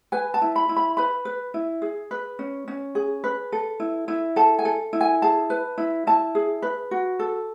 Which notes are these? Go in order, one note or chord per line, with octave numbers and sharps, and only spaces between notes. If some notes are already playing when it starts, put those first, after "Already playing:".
B4 G#5
A5
E4
B5
E4
B5
B4 B5
B4
E4
G#4
B4
C#4
C#4
G#4
B4
A4
E4
E4
A4 A5
G#5
A4
E4
G#5
G#4 A5
B4
E4
E4 A5
G#4
B4
F#4
A4